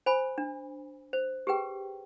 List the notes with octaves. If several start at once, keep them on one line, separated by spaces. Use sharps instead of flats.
C5 G#5 B5
D4
C5
G4 G#4 B4 G5